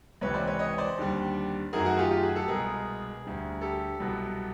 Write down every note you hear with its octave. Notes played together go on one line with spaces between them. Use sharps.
C#2 C3 E3 B4 C#5
C5 D5
B4 C#5
C#5 D#5
C5 D5
D#2 D3 G3
F#2 D#3 F#3 A3 G#4 A#4
F#4 G#4
F4 G4
F4 G4
F#4 G#4
G4 A4
C2 B2 G#3 G#4 A#4
D2 D3 G3
G4 A4
C2 B2 F#3